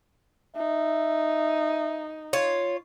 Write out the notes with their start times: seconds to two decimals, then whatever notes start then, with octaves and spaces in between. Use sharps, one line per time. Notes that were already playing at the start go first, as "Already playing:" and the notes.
0.56 D#4 E5
2.33 F4 C#5